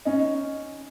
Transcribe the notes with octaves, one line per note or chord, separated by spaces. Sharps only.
C#4 D#4